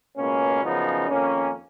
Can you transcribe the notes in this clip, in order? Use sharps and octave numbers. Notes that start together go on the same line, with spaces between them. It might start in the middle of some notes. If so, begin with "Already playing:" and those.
C#2 B2 A#3 C#4
F#2 C#3 F3 B3 D#4
F2 D#3 A#3 C#4